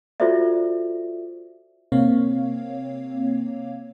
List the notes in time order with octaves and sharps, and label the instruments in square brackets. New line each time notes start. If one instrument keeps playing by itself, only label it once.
[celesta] F4 F#4 A4 C5 D5 E5
[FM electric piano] C3 A#3 C4 C#5 F5